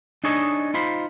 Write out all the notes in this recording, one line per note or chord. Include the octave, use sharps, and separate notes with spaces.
D4 D#4 G#4 A4 C#5 D#5
D#4 F4 C5 B5